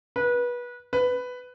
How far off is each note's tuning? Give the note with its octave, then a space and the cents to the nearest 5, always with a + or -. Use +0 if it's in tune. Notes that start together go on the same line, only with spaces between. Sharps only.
B4 -25
B4 +10